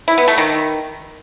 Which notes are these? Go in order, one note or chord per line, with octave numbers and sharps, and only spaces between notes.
E4
B3
A3
D#3